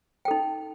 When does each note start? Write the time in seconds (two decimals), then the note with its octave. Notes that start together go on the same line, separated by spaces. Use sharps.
0.25 G5
0.28 A4
0.31 D#4